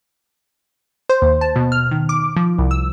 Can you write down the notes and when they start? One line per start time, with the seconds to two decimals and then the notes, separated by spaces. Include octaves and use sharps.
1.09 C5
1.22 D#2
1.41 A5
1.56 B2
1.72 F6
1.91 D#3
2.09 D6
2.36 F3
2.58 C2
2.71 E6